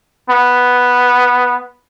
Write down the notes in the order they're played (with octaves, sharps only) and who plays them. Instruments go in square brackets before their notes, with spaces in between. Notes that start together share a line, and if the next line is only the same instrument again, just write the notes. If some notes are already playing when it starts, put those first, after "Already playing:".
[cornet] B3